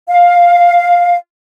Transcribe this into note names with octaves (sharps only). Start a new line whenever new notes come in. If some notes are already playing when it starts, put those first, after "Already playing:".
F5